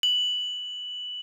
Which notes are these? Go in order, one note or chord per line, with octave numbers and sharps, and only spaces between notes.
F#7